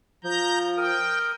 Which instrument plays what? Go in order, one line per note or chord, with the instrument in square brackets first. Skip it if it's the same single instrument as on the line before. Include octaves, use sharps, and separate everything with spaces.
[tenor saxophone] F3 [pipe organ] A#5 G6
[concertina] A#4 D#6 [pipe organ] G5